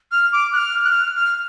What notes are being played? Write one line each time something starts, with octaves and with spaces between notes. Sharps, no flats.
F6
D6
F#6
F6
F#6
F6
F6